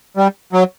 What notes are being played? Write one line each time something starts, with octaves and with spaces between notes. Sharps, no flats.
G3
F#3